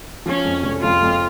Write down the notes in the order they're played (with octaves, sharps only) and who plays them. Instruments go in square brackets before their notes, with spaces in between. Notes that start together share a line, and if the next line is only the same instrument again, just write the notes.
[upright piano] F3 [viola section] C#4
[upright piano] F2
F1
[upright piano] F2 [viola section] F4
[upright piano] F2